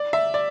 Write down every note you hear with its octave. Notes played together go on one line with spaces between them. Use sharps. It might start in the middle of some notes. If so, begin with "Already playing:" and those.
Already playing: D5
E5
D5